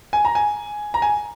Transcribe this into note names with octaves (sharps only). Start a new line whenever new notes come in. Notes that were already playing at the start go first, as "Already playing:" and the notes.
G#5
A#5
G#5
A#5
G#5